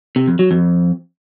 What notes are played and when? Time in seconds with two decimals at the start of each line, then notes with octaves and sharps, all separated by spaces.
0.16 C3
0.28 F2
0.39 F#3
0.51 F2